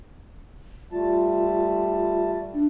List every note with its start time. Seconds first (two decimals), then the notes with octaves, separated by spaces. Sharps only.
0.92 G3 A3 F4 A5
2.54 D4